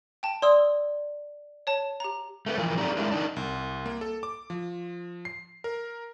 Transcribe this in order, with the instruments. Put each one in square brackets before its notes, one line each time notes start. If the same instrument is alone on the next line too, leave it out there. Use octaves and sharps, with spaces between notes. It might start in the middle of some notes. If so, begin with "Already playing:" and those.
[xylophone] G5 A5
[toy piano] D5 [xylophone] C6 D#6 E6
[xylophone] C#5 A5
G4 A#5
[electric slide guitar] A3 A#4 B4
E3 F3 A#4
C4 D#4 G4 A4 D5 A#5
G#3 D4 E4 A#4
D4 D#4 A#4
[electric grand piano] C2
A#3
A4
D6
F3
C7
A#4